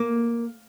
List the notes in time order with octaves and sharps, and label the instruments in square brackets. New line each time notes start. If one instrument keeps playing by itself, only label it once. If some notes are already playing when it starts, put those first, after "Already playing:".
Already playing: [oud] A#3